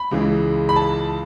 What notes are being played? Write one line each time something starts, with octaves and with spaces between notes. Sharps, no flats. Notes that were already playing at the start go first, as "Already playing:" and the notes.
Already playing: B5
C#2 C#3 E3
B5
A5